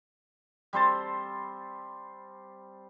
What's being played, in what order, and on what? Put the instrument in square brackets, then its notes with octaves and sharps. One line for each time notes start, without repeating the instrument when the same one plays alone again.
[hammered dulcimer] G3 C4 C5 A5